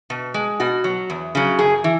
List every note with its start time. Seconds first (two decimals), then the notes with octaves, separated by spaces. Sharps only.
0.10 B2
0.34 G#3
0.60 B2 F#4
0.84 F#3
1.10 E2
1.35 C#3 F#3
1.59 F#2 G#4
1.84 E3